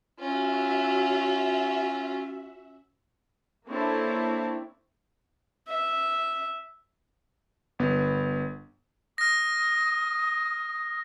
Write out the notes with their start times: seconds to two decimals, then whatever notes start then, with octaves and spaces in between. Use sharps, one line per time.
0.19 C#4 F4 F#4 E5
3.69 A#3 C4 D4 E4 A4 C#5
5.68 E5
7.79 G1 B3
9.18 D#6 F6 A#6